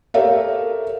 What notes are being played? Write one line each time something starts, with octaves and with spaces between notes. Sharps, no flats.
G4 A4 A#4 C#5 E5 F5